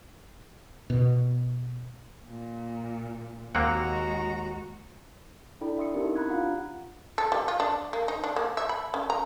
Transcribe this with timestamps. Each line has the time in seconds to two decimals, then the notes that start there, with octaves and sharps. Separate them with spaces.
0.90 B2
2.26 A#2
3.55 D#2 G#3 A#3 C4 F#4 F#5 A#5
5.61 D4 E4 A4 D5 G5 B5
5.78 E5 C6 D#6 C#7
5.94 C4 C#4 D#4 E4 G4 A#4
6.16 A#5 B5 F#6 G#6
6.29 D4 F4 F5 F#5 B5
7.18 A4
7.32 G3
7.48 F4
7.60 D4
7.93 A#3
8.08 D#4
8.24 D4
8.36 A#3
8.57 E5
8.69 B5
8.94 C#4
9.10 A#5